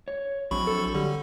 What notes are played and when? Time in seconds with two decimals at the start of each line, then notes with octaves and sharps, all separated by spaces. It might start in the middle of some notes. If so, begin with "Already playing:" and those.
0.08 C#5
0.51 A#1 F#3 C4 B5 C#6
0.67 A4
0.94 D3 G3